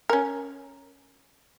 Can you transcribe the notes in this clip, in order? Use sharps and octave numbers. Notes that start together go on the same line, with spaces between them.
C#4 A#4